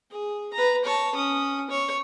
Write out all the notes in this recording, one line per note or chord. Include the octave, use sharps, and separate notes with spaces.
G#4
B4 A#5
C#5 A5
C#4 D#6
C#5